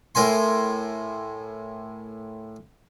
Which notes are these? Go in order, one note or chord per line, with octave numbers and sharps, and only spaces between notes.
A2 A#4 G#5 C6